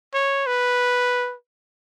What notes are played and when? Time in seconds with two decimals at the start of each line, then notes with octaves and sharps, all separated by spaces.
0.14 C#5
0.46 B4